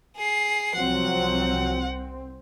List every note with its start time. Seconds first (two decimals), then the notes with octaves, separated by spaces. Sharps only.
0.17 G#4 C7
0.75 C2 F3 F#3 C4 F#4 F#5